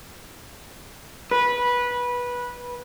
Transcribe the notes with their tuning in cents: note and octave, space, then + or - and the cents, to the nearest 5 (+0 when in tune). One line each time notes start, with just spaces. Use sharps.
B4 -15